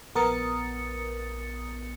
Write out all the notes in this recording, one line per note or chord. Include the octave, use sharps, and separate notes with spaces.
A#1 B3 A#4 D#6 A6 C#7